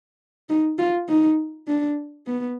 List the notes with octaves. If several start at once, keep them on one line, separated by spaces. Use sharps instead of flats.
D#4
F4
D#4
D4
B3